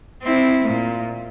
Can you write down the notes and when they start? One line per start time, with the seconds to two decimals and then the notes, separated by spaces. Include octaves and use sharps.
0.22 C4 E4
0.64 A#2